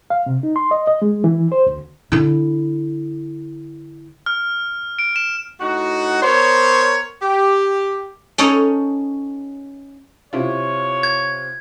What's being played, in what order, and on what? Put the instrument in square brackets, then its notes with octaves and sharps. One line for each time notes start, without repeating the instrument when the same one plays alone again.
[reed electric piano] F5
C3
D#4
C6
D#5
D#5
G#3
E3
C5
D2
[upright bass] D3 E4
[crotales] F6
D7
E7
[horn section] A2 D#4 F#4
B3 A#4 C5 C#5
G4
[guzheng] C#4 D#4 A4 C#5
[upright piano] C3 E4 F4 [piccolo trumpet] C#5
[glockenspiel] G#6